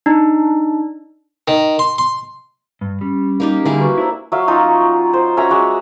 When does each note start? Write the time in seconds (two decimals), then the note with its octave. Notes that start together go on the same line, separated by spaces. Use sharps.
0.06 D4 D#4
1.48 D#3
1.79 C6
1.98 C6
2.81 G2
3.01 G3 C#4
3.40 A#3 D#4 G4
3.65 D3 G3 A#3 E4 G#4 F5
3.79 F#4 B4 C#6
3.98 D4 E4 C5 A#5 E6
4.32 F#3 E5 F5
4.48 F#3 C#4 D#4 F4
5.13 C5
5.37 C#4 F#4 E5 A#5
5.50 G#3 F#4 D5